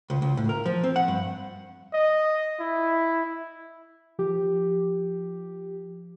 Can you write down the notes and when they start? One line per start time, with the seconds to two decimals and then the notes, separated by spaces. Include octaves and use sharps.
0.10 C#2
0.22 C#2
0.37 A2
0.49 A#4
0.66 F3
0.84 C4
0.96 F#5
1.08 G2
1.93 D#5
2.60 E4
4.19 F3 G4